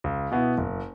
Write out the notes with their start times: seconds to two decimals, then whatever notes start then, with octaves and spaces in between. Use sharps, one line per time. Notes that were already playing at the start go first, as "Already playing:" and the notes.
0.04 C#2
0.31 B2 B3 E4
0.58 F#1